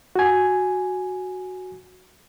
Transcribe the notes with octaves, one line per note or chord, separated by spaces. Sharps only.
F#4 G#5